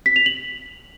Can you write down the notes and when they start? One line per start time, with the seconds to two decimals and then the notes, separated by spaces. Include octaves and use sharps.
0.06 B6
0.16 F7
0.26 F#7